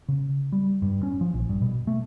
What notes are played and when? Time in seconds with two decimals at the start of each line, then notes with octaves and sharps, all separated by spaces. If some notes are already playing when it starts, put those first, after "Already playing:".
0.09 C#3
0.52 G3
0.82 G2
1.03 C#4
1.21 F3
1.34 A#1
1.49 G2
1.62 B2
1.87 A3